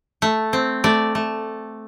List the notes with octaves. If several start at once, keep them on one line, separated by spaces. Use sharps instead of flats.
A3
C4
A3 D5
A3